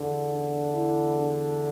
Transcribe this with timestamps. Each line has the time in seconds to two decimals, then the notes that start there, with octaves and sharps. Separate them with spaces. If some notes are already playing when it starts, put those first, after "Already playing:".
Already playing: E2 D3
0.29 D4
0.74 E4
1.18 D4